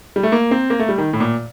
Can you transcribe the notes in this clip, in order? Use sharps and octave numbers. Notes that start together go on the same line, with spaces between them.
G3
A3
A#3
C4
A#3
A3
G3
D#3
A2
A#2